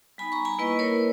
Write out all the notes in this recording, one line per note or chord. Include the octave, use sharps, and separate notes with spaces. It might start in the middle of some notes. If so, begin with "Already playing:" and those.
G3 B3 D#4 G#5 B5
A#5 C#6
G#5 B5
A#3 E4 B4 D#5
A#4 C#5